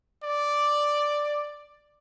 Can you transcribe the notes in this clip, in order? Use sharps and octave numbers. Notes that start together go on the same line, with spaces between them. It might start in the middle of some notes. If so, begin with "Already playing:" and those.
D5